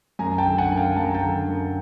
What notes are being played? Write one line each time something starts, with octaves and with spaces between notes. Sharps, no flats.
F#2 G#5 A#5
G5 A5
D3
F#5 G#5
F#2
F5 G5
F#2 A5
A#5
G5 A5
D3
F#2